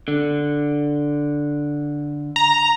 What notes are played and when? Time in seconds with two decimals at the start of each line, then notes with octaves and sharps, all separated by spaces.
0.08 D3
2.36 A#5